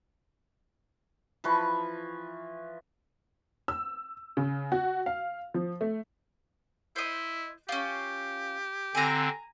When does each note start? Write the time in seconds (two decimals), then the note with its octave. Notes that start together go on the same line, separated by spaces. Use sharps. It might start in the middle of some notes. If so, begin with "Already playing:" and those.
1.44 E3 F3 B4 C#6
3.68 E6
4.37 C#3
4.72 F#4
5.06 F5
5.54 F3
5.81 A3
6.96 E4 C5 D#5
7.69 C#4 F4 G4
8.95 D3 C4 G#5 A#5